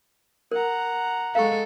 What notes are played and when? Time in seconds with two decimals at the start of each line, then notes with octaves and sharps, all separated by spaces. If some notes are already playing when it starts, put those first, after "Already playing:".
0.51 A#4 F#5 A#5
1.35 G#3 A4 F5 C#6